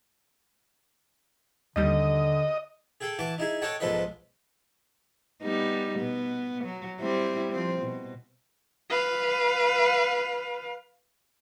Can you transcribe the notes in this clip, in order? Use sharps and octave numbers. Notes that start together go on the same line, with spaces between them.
D#2 D3 G3 D#5
G#4 A4 G5
E3 F#4 A5 D6
D#4 E4 G#4
A4 C#5 D#5 F#5 G5 A5
B1 G#2 F3 A4 B4 D#5
G3 B3 D#4
B2 B3
F#3
G3 C4 E4
F3 C4
B2
B4 F5